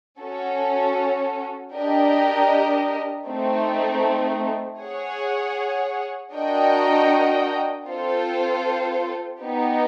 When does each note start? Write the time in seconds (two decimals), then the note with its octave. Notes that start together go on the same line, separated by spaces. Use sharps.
0.21 C#4 F#4 A4
1.74 D4 G4 A#4 D#5
3.27 A3 C4 D#4
4.81 G#4 C#5 F#5
6.34 D4 F#4 A#4 D#5 G5
7.87 C4 F4 A4 C5
9.41 B3 D#4 G4